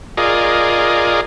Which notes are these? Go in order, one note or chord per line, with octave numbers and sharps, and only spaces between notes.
F4 G#4 A#4 D5 D#5